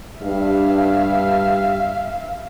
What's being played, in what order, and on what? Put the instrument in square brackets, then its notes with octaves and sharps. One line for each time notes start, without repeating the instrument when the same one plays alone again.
[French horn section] G2 [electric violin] E5 F5